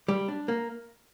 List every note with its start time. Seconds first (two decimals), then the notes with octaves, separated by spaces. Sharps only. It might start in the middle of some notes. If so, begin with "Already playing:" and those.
0.08 G3
0.28 D4
0.48 A#3